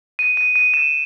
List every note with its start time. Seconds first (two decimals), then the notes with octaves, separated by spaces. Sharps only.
0.19 D#7
0.37 D#7
0.56 D#7
0.74 E7